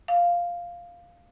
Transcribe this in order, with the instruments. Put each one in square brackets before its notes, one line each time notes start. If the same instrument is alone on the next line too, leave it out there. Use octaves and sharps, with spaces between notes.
[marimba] F5